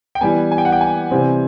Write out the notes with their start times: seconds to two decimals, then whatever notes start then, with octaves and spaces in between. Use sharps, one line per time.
0.15 G5
0.21 E3 G3 B3 G#5
0.51 G#5
0.58 G5
0.65 F#5
0.72 G5
0.81 G#5
1.11 C3 E3 G3 C4